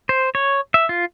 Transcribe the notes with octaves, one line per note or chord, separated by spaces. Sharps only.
C5
C#5
E5
F4